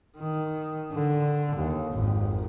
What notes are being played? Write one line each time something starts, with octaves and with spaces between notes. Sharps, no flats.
D#3
D3
D#2
G#1 F2